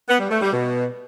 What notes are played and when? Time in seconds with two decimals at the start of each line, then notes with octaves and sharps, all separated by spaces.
0.08 B3
0.19 G3
0.30 A3
0.41 G3
0.52 B2